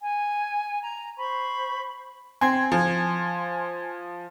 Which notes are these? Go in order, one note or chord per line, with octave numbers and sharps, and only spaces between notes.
G#5
A#5
C5 B5 C#6
C4 G#5 C6 G#6
F3